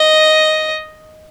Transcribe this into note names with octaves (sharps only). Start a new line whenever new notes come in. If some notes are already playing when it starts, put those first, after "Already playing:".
Already playing: D#5